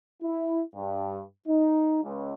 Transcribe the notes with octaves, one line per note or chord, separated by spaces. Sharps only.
E4
G2
D#4
C#2